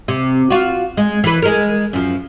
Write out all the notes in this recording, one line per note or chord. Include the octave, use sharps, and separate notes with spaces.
C3
F4 F#4
G#3
E3 B4
G#3 A#4
F#2 F3